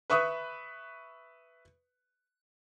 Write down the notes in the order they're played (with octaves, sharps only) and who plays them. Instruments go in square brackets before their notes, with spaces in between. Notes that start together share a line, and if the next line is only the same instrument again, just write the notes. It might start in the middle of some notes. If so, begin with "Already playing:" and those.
[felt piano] B4 E5 C#6 D#6 F#6